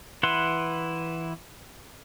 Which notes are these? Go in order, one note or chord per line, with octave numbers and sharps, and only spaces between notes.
E3 E4 B4 F#5 C6